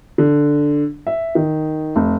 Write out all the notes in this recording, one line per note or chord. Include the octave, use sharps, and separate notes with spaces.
D3
E5
D#3
F1